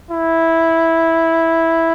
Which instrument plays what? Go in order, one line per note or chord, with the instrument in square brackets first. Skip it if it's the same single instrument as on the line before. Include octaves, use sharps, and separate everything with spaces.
[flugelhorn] E4